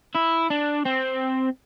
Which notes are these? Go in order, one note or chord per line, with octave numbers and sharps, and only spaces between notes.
E4
D4
C4